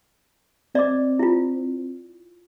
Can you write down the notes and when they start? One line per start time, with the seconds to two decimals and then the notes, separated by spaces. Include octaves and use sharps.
0.75 C4 D5 D#5 D6
1.19 E4 F4